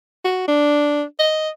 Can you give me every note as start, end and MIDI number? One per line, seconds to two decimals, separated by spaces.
0.25 0.47 66
0.48 1.04 62
1.19 1.49 75